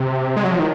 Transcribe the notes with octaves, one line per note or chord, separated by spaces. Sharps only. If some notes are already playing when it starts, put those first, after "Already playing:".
Already playing: C3
G#3
F#3
F3
D#3